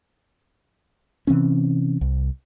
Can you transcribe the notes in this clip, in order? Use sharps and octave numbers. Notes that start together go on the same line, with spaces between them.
C3 E3 C4 C#4
C2